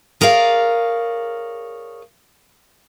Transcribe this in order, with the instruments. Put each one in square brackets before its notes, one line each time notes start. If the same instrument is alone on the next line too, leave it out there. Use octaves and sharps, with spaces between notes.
[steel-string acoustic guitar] G#4 A#4 C#5 D5 F5